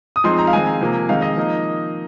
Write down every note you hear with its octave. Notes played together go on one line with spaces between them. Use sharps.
D#6
F3 G#3 C4 D#4 C6
A#5
F5
D#3 G#3 C4 G#5
C3 F3 A#3
D#3 G#3 C4 D#4 F5
D#5
F3 A#3 D#4